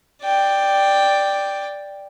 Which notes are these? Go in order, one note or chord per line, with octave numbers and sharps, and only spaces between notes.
D5 G5